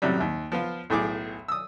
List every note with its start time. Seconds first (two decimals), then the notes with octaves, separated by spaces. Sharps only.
0.02 F#2 A2 C3 F#3 G3
0.20 D#2
0.52 F3 B3 F4
0.90 B1 A2 G#4 D6
1.48 D#6 E6